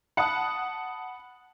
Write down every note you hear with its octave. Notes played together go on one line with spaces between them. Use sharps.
F#5 A5 B5 D#6